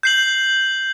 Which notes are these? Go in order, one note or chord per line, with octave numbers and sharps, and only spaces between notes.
G6 C7 F#7